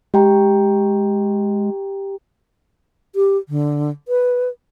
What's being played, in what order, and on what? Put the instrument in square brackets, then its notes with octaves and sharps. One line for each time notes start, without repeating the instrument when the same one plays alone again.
[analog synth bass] G#3 [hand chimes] G4 G5 A#5
[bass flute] G4
D3
B4